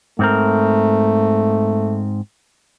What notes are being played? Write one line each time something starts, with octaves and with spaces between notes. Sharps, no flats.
G#2 A3 C4 A#4